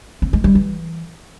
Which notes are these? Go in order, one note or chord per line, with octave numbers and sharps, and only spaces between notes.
C4
G#3
G3
E3